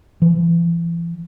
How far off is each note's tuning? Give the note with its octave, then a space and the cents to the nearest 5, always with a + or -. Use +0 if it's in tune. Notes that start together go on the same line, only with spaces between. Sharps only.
E3 +40